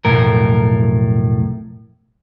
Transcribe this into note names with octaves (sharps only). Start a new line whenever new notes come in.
B1 F2 A2 A#4